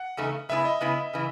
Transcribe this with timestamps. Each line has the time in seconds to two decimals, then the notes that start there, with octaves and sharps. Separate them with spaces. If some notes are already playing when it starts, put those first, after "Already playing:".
Already playing: F#5
0.17 E2 C#3 A3 D#4
0.49 C#3 G#3 B3 E4 E5
0.65 D#5
0.81 C#3 G#3 B3 E4
1.13 C#3 E3